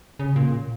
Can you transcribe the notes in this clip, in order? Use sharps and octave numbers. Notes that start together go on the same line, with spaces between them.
C#3
A#2